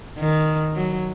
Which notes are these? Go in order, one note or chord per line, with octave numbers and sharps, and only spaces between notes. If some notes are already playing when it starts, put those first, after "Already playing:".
D#3
F#3